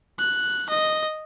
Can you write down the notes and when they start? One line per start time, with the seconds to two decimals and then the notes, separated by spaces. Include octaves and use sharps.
0.19 F#6
0.70 D#5